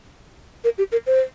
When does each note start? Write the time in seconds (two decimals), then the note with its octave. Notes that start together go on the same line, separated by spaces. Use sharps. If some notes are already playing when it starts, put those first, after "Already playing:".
0.64 A#4
0.78 G4
0.92 A#4
1.07 C5